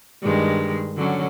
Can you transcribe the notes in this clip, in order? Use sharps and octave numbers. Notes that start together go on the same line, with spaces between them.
G2 D#3 G#3
D3 F#3 C#4